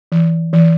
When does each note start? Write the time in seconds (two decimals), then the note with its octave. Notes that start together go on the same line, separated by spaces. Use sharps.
0.12 E3
0.53 E3